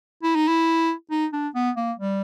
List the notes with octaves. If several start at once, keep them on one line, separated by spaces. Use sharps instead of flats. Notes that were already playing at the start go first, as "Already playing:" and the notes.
E4
D#4
E4
D#4
D4
B3
A#3
G3